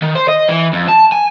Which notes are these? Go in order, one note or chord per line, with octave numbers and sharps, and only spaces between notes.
D#3
C5
D#5
E3
F2
A5
G#5